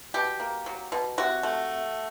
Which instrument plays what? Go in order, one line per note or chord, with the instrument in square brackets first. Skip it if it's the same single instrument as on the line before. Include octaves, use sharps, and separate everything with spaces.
[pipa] B2 G4
A#3
F#3
B2
C3 F#4
A3